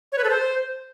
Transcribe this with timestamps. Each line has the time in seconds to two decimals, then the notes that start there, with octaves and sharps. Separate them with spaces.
0.12 C#5
0.18 B4
0.24 A4
0.30 C5